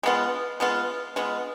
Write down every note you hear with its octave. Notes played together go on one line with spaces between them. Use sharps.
G#3 B3 F4
G#3 B3 F4
G#3 B3 F4